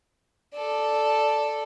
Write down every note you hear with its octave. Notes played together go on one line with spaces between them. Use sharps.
A4 D5